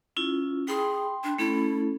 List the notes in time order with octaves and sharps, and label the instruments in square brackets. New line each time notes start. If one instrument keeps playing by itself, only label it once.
[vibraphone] C#4 E4 F4
[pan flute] G#4 [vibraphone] G5 B5 C6
[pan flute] D4
[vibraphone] A3 C#4 A4 [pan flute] E4